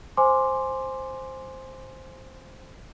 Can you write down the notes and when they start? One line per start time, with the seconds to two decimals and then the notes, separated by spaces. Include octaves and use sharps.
0.17 C5 G#5 C6 D6